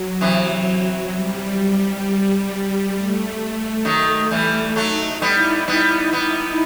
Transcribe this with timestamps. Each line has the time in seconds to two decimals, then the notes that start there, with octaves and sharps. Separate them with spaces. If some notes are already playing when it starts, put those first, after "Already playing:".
Already playing: F#3
0.21 C3 E3
1.12 G3
2.95 A3
3.85 D#3 F#3
4.31 E3 G3
4.76 F#3 A3 D#4
5.21 G3 B3 E4
5.67 G3 B3 E4
5.97 D#4
6.13 G3 B3
6.29 E4